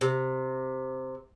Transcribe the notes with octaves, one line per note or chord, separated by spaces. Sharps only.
C3